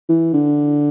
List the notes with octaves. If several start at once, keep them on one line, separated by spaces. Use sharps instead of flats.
E3
D3